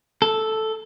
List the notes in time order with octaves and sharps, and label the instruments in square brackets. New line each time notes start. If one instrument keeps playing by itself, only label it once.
[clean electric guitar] A4